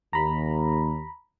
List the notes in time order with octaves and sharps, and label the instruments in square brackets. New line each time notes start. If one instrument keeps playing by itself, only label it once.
[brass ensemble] D#2 [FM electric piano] A#5 B5